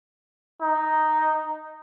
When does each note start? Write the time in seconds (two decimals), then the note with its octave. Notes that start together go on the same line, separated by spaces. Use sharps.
0.62 D#4